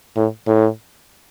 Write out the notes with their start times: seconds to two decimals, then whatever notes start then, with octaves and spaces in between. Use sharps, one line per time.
0.16 A2
0.47 A2